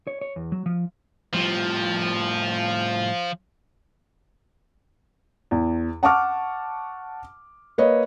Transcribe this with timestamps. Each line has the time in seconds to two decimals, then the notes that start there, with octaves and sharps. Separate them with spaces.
0.07 C#5
0.21 C#5
0.36 E2
0.52 F#3
0.66 F3
1.34 A2 F3 G3 F4
5.51 E2
6.03 F#5 A5 C#6 D6 F6
7.78 A#3 B4 C#5 D#5